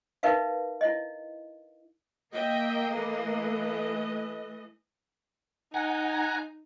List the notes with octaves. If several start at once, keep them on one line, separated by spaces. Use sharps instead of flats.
D#4 A#4 B4 E5 F5
E4 D#5
A#3 D#5 E5 G5
E3 A3 D#5
D#4 F#5 G#5 A#5